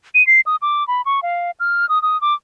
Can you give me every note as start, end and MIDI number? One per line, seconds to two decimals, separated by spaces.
0.15 0.25 99
0.27 0.41 96
0.46 0.56 87
0.62 0.86 86
0.88 1.02 83
1.06 1.23 85
1.23 1.51 77
1.60 1.88 89
1.89 2.01 87
2.02 2.19 87
2.21 2.34 86